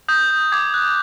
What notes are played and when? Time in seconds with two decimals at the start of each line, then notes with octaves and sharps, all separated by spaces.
0.08 D#6 G6
0.30 G6
0.52 D6 G#6
0.74 F#6